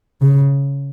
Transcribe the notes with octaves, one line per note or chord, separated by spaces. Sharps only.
C#3